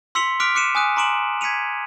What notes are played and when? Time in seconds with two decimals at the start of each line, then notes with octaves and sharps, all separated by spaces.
0.15 C6 E6 B6 C#7 F7 G7
0.40 D6 F6 F#6 B6 D7 F7
0.55 D6 F#6 C#7 D#7 E7
0.75 G#5 D#6 F#6 D#7
0.96 A#5 C6 D6 D7 E7 F#7
1.41 G#6 B6 C#7 D#7 F7